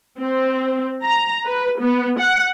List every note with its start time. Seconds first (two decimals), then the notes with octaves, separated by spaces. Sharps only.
0.19 C4
1.04 A#5
1.45 B4
1.80 B3
2.19 F#5